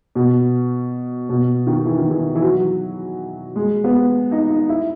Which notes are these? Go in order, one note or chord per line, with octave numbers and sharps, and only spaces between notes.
B2
B2
D#3
E3
D#3
E3
E3
F#3
G#3
B3
D#4
D#4
E4